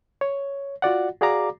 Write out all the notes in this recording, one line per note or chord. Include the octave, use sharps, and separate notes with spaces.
C#5
F4 F#4 D5 F#5
F#4 G#4 D5 F5 A#5 D6